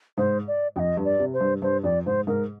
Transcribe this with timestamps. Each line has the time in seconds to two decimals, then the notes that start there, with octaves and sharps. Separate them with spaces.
0.18 G#2 C5
0.48 D5
0.76 F2 G5
0.79 D#5
0.97 G2
1.05 D5
1.20 C3
1.34 C5
1.40 G2
1.62 G2 C5
1.84 F2 D5
2.06 G#2 C5
2.27 G#2 A#4